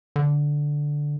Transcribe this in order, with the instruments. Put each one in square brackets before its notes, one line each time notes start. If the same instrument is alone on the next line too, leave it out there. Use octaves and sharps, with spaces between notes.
[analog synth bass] D3